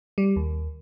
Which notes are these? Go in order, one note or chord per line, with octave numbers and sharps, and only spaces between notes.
G3
D#2